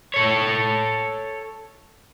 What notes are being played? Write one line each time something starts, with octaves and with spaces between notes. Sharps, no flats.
A4 C#5